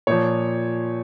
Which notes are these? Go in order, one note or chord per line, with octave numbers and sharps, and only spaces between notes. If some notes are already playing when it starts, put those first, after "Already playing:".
A#2 F3 C#5